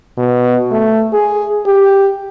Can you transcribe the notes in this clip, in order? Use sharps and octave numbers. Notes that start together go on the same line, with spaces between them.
B2
A3
G#4
G4